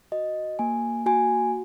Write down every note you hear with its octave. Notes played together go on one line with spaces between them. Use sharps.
F#4 D#5
A#3 G#5
F#4 G#5